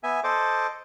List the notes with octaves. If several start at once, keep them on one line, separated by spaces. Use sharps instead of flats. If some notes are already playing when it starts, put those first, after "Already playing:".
B3 E5 G#5
A4 C5 D#5 D6